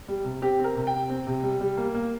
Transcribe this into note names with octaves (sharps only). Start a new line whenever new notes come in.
G3
C3
C4 G4
C4
A#4
C3
G5
C3
C4
C3
G3
G3
A#3
A#3